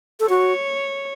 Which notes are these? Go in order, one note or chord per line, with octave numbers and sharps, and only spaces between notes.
A4
F#4 C#5